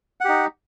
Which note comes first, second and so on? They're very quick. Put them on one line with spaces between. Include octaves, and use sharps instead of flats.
F#5 G4 D#4